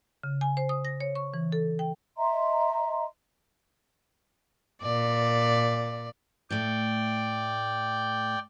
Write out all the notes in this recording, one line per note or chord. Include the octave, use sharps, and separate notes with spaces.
C#3
G#5
C5
D#6
A#6
C#5
C#6
E3
A4
G5
D#5 E5 A#5 C6
A#2 D5
A2 A3 D5 G5